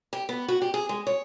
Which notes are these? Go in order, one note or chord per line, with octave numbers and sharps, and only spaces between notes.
G4
B3
F#4
G4
G#4
G#3
C#5